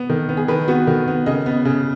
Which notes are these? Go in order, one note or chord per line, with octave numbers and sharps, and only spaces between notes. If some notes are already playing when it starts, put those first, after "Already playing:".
Already playing: B3
D#3
B3
G#4
D#3 B4
B3 F#4
D#3
B3
C#3 D#5
B3
C#3